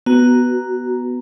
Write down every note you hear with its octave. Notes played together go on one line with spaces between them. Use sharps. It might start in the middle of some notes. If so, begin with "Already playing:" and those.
B3 F#4 A#5